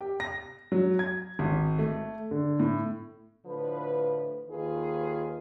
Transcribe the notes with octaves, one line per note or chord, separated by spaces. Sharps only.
G4
A#6
F#3
G#6
G#1
A3
D3
A2
A2 D3 F3 B4
D#2 D#3 F4 G#4 B4